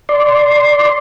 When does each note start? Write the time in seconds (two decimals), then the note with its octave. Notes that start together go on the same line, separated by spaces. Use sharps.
0.09 D5 C6